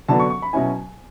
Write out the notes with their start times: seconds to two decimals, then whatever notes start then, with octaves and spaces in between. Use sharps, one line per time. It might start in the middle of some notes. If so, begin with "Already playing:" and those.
0.08 D3 F#3 B3 D4 A5
0.20 C#6
0.30 C#6
0.42 B5
0.53 B2 F#3 C#4 E4 G#5